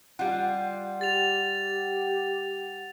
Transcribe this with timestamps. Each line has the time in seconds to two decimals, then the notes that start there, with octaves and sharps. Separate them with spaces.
0.19 G3 F4 F#5
1.01 G4 A6 F7